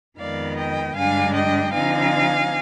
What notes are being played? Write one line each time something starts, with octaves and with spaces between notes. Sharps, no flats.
F2 D#3 G#3 B3 D5 F5
D#5 G5
G2 D3 G#3 D4 F5 G#5
D#5 G5
D3 F3 C4 D#4 F5 G#5